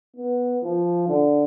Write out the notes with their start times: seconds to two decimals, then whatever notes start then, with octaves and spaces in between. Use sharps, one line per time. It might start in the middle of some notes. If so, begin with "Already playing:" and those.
0.16 B3
0.64 F3
1.08 D3